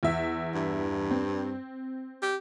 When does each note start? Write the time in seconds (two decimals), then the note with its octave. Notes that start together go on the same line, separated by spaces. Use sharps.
0.03 E2 E5
0.54 G2
1.11 C4
2.22 G4